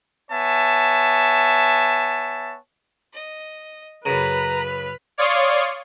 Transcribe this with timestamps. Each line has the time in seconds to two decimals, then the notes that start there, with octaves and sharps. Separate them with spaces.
0.31 B3 C#5 E5 G#5 A5
3.13 D#5
4.05 F#2 C#3 B4 A#5 B5 F6
5.18 C#5 D5 F5 C6 C#6 D#6